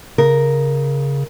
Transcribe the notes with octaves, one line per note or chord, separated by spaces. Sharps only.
C#3 A#4